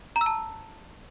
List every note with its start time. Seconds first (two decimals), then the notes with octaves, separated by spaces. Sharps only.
0.16 A#5
0.21 E6
0.26 A5